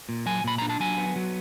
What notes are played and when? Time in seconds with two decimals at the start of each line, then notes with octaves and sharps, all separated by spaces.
0.09 A#2
0.26 F#3 G#5
0.44 A#2 B5
0.58 D4 A#5
0.69 A5
0.80 F#3 G#5
0.98 B3
1.16 F#3